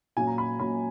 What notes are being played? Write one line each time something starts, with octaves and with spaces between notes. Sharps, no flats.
A#2 F#3 C#4 G#5
A#5
B5
A#2 F#3 C#4 B5